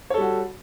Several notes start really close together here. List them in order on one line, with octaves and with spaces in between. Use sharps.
C#5 A4 G3 F#4